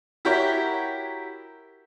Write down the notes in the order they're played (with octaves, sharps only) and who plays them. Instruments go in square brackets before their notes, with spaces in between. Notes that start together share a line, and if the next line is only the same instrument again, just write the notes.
[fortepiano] E4 F#4 G4 A#4 C#5